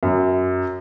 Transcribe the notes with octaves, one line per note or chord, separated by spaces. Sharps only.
F#2